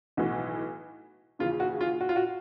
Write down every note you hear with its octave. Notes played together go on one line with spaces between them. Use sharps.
B1 A2 E3 F#4
D#2 C#3 E3 F4
F#4
F4
F#4
F4
F#4